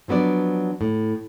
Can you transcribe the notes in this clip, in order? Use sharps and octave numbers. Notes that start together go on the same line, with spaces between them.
F3 F#3 B3 D4 D5
A2